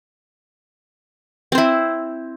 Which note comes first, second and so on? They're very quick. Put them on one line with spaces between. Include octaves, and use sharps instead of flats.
C4 C5 E4